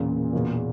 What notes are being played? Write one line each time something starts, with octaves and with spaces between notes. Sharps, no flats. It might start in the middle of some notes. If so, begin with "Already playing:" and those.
Already playing: E1 E2 A#2 C#3
E1 E2 B2 A#3